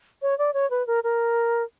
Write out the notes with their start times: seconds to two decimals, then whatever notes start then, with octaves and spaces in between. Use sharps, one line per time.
0.22 C#5
0.38 D5
0.54 C#5
0.70 B4
0.87 A#4
1.04 A#4